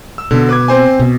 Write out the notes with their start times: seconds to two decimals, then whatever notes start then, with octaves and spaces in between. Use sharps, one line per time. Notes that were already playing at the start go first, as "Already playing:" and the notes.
0.18 E6
0.31 B2 D3
0.49 B4 D6 G#6
0.68 C4 C5 G#5
0.99 B2